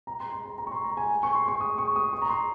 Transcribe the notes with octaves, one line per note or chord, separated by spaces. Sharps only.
A#5
C6
C6
A#5
A#5
C#6
C6
A#5
G#5
G#5
C#6
C6
C#6
D#6
C#6
D#6
C#6
A#5
C6